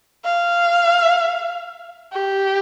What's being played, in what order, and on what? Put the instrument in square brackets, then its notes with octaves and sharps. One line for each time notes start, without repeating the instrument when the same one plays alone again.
[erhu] F5
G4